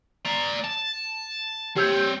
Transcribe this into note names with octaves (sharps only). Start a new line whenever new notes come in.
D5 A#5
A5
C4 G4 C#5 E6 G6